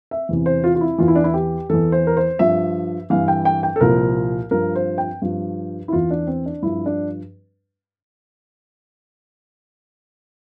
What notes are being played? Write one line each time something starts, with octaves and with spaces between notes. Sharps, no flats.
E5
E2 C3 E3
C5
F4
F4
E4
E2 E3 F4
E4
D4
E4
G4
E2 E3 A4
C5
A#4
C5
G2 F3 E5
G2 E3 F5
G5
G5
G5
A4
C2 A#2 F3 A#4
G2 F3 A#4
C5
G5
G2 F3
E4
E2 E3 F4
D4
C4
D4
G2 F3 E4
D4